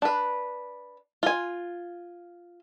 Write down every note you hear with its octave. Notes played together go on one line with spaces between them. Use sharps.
D4 B4
F4 G#5